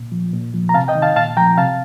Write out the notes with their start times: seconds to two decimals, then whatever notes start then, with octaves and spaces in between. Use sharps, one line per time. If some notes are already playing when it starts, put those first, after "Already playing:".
Already playing: A#2
0.12 F3
0.33 A#2
0.54 F3
0.69 A#5
0.74 C3 F5 A5
0.88 D#5 G5
0.95 D#3
1.02 F5 A5
1.16 A#2 F5 A5
1.37 F3 G5 A#5
1.58 C3 F5 A5